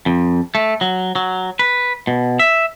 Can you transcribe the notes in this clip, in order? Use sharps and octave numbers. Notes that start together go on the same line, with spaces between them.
F2
A3
F#3
F#3
B4
B2
E5